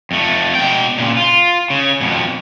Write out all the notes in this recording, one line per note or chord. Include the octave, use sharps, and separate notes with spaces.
F2 A3
B2 G5
A#2 C#3
F4
C#3
F2 B2